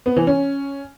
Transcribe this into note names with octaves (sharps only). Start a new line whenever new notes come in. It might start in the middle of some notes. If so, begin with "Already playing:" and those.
B3
E3
C#4